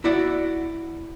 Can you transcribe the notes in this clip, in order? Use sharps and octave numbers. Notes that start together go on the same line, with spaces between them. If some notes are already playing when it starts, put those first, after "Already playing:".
E4 F#4 D5 F#5